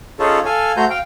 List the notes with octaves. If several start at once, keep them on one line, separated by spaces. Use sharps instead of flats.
C#4 D#4 F4 G#4 A4 C#5
A4 F5 G#5
A3 F#4 C5 A#5 G6
F5 G5